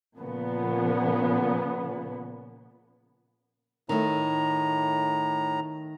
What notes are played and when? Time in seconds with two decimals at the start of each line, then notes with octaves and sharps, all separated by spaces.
0.18 A#2 C#3 F3 B3
3.89 A2 D#3 A3 A#5